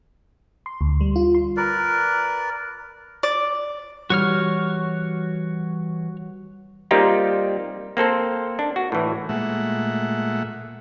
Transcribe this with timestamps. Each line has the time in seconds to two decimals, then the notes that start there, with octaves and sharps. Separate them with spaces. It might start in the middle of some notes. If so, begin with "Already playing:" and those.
0.66 C6
0.81 D2
1.01 G3
1.16 F4
1.34 C6
1.57 A#4 B4 D5
3.23 D5
4.10 E3 G3 F#4 C#5 F6
6.91 G3 A#3 C4 D#4 F4 G4
7.97 A#3 C4 A4 C5
8.59 D4
8.76 F#4
8.92 A2 E3
9.29 A#2 G#3 A3 E5 F#5